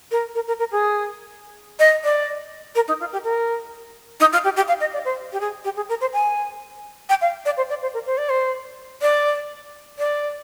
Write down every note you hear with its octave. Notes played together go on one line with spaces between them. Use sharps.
A#4
A#4
A#4
A#4
G#4
D#5
D5
A#4
D#4
F4
G4
A#4
D#4
F4
G4
G4
F5
D#5
D5
C5
G4
G#4
G4
G#4
A#4
C5
G#5
G5
F5
D5
C5
D5
C5
A#4
C5
D5
C5
D5
D5